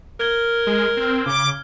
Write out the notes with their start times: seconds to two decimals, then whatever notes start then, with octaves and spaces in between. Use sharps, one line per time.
0.20 A#4 F6 G#6 G7
0.67 G#3
0.97 C4
1.26 C#3 D6